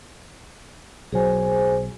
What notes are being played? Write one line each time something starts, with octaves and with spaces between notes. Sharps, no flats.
B1 F#3 G#4 C5 G#5